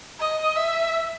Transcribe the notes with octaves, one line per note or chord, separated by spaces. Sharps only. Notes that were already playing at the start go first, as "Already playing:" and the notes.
D#5
E5